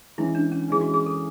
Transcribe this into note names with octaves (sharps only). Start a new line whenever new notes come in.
E3 G#3 C#4 E4
D4
C#4
E3 G#3 C#4 G#4
F#4
G#4
A4